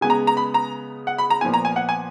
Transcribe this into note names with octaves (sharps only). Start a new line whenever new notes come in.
C#3 G#3 B3 G#5
A#5
A#5
B5
A#5
F#5
B5
A#5
A#2 F3 B3 G#5
A#5
G#5
F#5
G#5